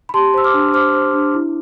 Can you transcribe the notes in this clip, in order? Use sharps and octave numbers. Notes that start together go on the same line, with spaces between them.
B5
G4 A5 C6
C5 E6
D6 F6
D4
C5 D6 F6
C5
D4
E4